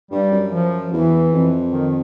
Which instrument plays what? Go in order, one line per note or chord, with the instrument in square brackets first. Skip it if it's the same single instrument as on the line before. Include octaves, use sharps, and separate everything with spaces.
[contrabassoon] G2 [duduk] G3
[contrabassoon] F#2
[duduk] F3
[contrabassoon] E2 [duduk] E3
[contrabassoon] F2
[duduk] D#3